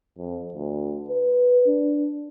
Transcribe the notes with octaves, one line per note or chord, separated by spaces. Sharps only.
F2
D2
B4
D4